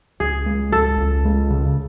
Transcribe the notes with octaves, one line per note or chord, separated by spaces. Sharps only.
C#2 G#4
G#3
C#2 A4
C#2
G#3
C#3